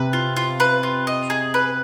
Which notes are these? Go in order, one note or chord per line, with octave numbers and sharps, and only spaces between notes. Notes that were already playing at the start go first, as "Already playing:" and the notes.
Already playing: C3 B4
F4
F4
B4
F4
D#5
G#4
B4